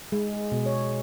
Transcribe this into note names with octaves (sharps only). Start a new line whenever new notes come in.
G#3
B2
C#5